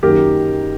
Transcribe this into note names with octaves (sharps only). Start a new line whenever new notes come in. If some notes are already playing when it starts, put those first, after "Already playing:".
F#2 D#3 F#3 A#3 D#4 G4 A#4